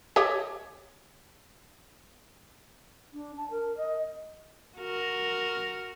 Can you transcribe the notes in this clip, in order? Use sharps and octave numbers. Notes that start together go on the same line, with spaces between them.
G4 C#5 D#5
D4
A5
A#4
D#5
F#4 A#4